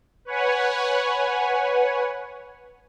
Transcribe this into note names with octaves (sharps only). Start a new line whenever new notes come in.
B4 C#5 F#5 G#5